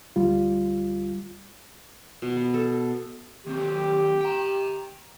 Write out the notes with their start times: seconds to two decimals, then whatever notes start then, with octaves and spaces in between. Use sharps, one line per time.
0.16 D2 G3 F4
2.22 B2
2.37 B3
2.54 A4
3.47 D#2 C4 G4
4.21 G5 A#5